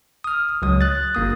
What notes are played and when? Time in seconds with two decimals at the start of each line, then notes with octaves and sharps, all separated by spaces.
0.24 D#6 F6
0.62 C#2 F#3 D#6
0.81 F#6 A6
1.15 G1 A#3 D#6